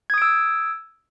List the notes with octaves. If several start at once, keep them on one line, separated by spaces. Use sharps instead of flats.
D#6 E6 G#6 D7